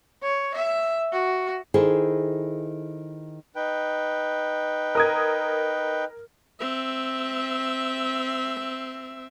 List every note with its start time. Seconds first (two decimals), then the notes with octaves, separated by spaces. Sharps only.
0.23 C#5
0.55 E5
1.12 F#4
1.74 D#3 E4 G#4 A4 C5
3.56 D#4 B4 G5
4.95 A#4 D#6 G#6
6.60 C4 E5